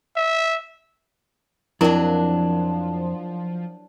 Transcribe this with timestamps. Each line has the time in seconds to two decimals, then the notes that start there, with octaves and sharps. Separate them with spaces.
0.17 E5
1.81 F2 F3 F#3 D4 E4 A#4